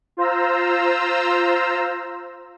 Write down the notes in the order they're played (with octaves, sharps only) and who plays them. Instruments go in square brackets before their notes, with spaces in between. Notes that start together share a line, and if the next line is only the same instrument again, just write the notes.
[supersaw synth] F4 C5 A#5 E6